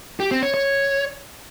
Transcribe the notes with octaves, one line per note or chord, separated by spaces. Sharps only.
G4
C4
C#5
C#5